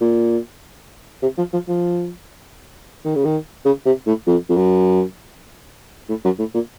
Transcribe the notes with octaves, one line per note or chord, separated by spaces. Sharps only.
A#2
C3
F3
F3
F3
D#3
C#3
D#3
C#3
C3
A2
F2
F2
F#2
A2
F#2
A2
A#2